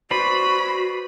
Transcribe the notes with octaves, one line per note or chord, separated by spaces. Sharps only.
F#4 B4 C5 D5 B5